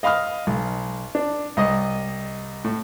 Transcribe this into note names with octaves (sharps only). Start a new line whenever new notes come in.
D#5 F5 B5 D#6 F6
B1
D4
C2 D#5 D#6
A2